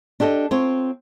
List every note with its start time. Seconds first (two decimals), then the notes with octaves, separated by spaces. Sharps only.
0.20 D4 G4 A4 C5 D#5
0.51 C4 F4 C5 C#5